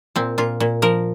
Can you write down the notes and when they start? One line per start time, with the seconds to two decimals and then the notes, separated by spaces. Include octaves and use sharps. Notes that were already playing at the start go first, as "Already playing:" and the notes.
0.16 A#2 C4
0.38 A#2 F4
0.60 A#2
0.82 F3 A#4